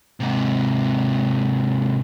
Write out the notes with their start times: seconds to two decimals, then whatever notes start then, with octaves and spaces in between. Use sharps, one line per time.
0.20 G#2 C3